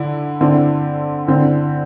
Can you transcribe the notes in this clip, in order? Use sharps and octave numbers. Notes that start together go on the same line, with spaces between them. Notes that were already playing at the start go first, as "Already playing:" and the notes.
Already playing: D3 E4
D3 C4 E4
D3 C4 E4